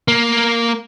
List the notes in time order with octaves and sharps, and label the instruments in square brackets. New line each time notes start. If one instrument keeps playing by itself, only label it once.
[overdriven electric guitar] A#3